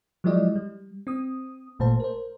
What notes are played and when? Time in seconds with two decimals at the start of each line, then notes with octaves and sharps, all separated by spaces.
0.24 F3 F#3 G#3 E4 D5 D#5
0.56 G3
1.07 C4 D#6
1.79 G#1 A#2 A3 C5 A5
2.00 A#4 C5